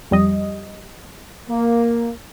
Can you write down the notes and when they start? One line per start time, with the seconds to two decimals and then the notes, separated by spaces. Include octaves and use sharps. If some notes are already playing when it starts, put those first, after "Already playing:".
0.11 F2 G3 D#5
1.50 A#3